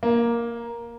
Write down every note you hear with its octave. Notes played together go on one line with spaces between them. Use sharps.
A#3